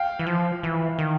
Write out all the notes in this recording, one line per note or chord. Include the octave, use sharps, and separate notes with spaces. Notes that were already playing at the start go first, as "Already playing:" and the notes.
Already playing: F5 G5
E3
F3
E3
D#3